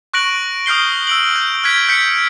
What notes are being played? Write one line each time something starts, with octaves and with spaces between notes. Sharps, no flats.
C#6 F#6 A#6 D7 F#7
D#6 F6 G6 C7 G7
E6 D7 F#7
G6
F6 F#6 G#6 B6 D7
G6 B6 C#7